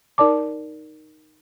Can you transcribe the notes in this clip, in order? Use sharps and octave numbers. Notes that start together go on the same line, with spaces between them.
D#4 A#4 D5 A5 D6